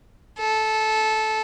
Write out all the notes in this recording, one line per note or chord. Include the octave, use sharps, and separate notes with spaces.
A4